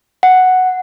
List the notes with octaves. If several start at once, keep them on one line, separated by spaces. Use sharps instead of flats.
F#5